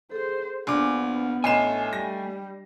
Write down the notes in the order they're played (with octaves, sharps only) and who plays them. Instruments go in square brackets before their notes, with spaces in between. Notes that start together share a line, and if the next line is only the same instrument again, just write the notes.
[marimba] G#4 A4 [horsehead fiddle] C5
[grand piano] A#1 D6 [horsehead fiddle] B3 [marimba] D4 D5 G#5
[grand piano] A1 C7 E7 [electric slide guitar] A3 G#5 [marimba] D#5
[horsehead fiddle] G3 [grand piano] A#6